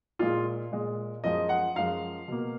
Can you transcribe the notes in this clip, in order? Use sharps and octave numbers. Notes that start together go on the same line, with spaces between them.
A#2 G#3 F4
A#2 G#3
F#2 F3 G#3 D#5
F#5
F#2 F3 G#3 F5
B2 A#3